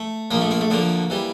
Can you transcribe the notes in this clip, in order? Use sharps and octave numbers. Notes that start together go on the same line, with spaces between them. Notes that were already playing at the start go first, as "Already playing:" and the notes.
Already playing: A3
A#1 A#2 F3 A#3
A3
A#3
A3
D2 D3 F3 A#3
E3 G3